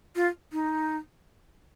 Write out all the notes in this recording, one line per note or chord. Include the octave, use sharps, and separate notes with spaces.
F4
D#4